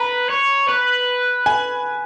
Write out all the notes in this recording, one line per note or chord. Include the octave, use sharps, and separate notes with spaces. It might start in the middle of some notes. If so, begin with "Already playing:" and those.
Already playing: B4 A#5
C#5
B4
G#5